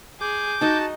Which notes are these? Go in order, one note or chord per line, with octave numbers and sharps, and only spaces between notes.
G#4 D6 G6
D#4 F#4 D#5 A5